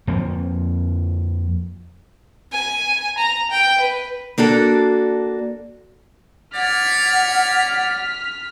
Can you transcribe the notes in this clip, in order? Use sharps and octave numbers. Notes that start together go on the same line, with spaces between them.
F2 F3 A#3
G#5
A#5
G5
B4
A#3 D4 F#4 A4
C#5 D5 F#5 F6 B6